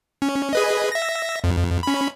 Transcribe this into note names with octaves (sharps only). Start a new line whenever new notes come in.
C#4
G#4 B4 D#5
E5 A#6
F2
C#4 B5